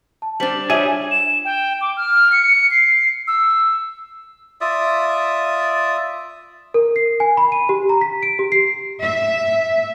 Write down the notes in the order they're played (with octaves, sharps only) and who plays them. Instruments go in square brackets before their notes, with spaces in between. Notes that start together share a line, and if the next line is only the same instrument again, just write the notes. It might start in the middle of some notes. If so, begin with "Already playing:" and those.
[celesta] A5
[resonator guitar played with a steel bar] G3 D4 [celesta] C5 B6 F#7
[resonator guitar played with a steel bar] G3 [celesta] F4 C#5 D#7 [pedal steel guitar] G#4 E5
[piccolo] E7
G5
D6
F6
C#7
C7
E6
[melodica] F4 D5 E5 D#6
[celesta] A#4
C7
G#5
B5
D#7
G4
A#5
B6
D7
G4
C7
[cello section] E5